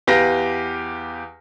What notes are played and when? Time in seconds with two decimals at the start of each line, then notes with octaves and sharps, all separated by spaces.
0.07 E2 G4 B4 F5 A#6